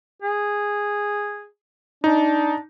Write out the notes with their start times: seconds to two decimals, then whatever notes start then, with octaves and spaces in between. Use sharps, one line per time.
0.22 G#4
2.04 D4 D#4